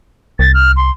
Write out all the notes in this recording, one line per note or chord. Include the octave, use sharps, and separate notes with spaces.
C2 A6
F6
C6